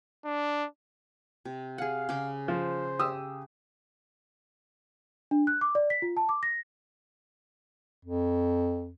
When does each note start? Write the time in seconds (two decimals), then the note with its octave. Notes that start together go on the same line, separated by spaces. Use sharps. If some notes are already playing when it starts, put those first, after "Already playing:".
0.25 D4
1.45 C3
1.78 G#4 F5 F#5
2.09 C#3 D6
2.48 F3 C5
2.99 G4 D#6 E6
5.31 D4
5.47 F#6
5.61 D6
5.75 D5
5.90 B6
6.02 F4
6.17 A5
6.29 D6
6.43 A#6
8.05 F2